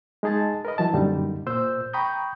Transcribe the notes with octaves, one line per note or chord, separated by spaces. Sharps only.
G#3 D#4 G#4 A5 A6
A#4 B4 D#5
E3 F#3 A5
F#2 A#2 D3 G3 D#4
A#2 C5 E6 G6
G5 A#5 B5 C#6 D#6 G6